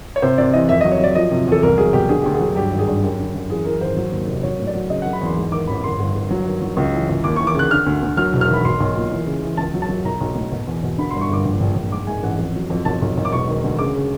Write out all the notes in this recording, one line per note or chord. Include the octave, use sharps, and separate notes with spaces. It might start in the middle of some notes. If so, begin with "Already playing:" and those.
C#5
C3 C5
C3 D5
E3 D#5
F2 E5
D#5
F#3
C#5
F#3 D5
F3 D#5
C3
E2 A4
C2 A#4
F#3 G#4
B2 G4
D3 G#4
D2 G4
G#4
F#3
G2 G4
G#1
G#4
G2
F#2 G4
D3
F#2
E3 G#4
E3 A#4
G#1 C5
F#3
D#2
F1
F#3 C#5
A2
D5
F#3
C#3 D#5
F#5
F#3
B5
E2 C6
G#2
D#3 D6
A1 B5
G1 C6
G1
G1
F#3
D#3
F#3
C#2
E3
C#2
D#2 D6
E3 C#6
D6
C#3 F#6
D3 F6
D2
D2
F#3 F6
E1
F6
D#3 B5
B1 C6
B1
A#2
E3
C#3
E3
C#2 A5
F#3
A5
F#3
B1 A#5
B1
A2
B2
E2
B2
D3 B5
C6
G2
C#6
G1 D6
A#1
A#1
A#1
G#2 D6
G#2 G#5
A1 F#5
F2
F#3
F2
B1 A5
B1
B1
D6
E1 C#6
D#3
D2
C#3 D6
C#3